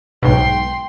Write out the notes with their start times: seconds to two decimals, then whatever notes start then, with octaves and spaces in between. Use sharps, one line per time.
0.23 B1 G#2 B2 G5 C6